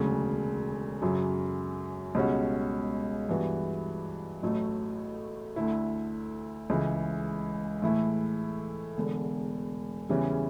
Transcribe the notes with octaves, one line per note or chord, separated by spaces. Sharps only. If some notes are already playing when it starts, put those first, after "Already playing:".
Already playing: E1 D2 C#3 F#3
F#2 C#3 F#3
C#2 B2 G3 C#4 F#4
G2 E3 B3 F#4
A1 A2 F#3 A3
D2 D3 A3 E4
C#2 C#3 E3
A2 E3 A3 E4
E1 E2 D3
E2 C#3 E3 G3 C#4